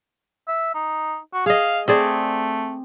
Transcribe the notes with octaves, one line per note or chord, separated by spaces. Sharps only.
E5
D#4
F#4
G#4 D#5 F5
A3 C4 G#4 D5